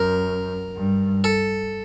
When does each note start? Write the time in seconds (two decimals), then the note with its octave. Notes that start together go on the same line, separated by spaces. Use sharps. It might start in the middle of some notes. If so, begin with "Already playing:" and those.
Already playing: F#2 A#4
0.76 G2
1.24 A4